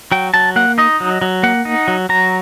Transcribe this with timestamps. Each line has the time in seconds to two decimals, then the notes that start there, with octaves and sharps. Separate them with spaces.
0.12 F#3 G5
0.34 F#3 A5
0.56 A#3 F#5
0.78 D#4 D#5
1.00 F#3
1.22 F#3
1.43 A#3 F#5
1.65 D#4
1.88 F#3
2.09 F#3 A#5